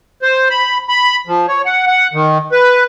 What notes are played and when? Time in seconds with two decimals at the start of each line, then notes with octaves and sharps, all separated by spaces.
0.22 C5
0.50 B5
0.89 B5
1.27 F3
1.48 C#5
1.65 F#5
1.87 F#5
2.13 D#3
2.52 B4